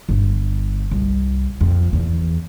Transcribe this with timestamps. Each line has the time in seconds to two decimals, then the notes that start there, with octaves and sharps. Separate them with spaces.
0.09 G1
0.91 C2
1.61 F2
1.93 E2